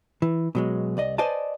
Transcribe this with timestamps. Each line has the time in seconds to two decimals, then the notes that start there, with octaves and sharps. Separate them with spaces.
0.22 E3
0.55 B2 F#3 G#3
0.97 C2 D5 D#5
1.18 B4 C5 D5 D#5 G#5 A5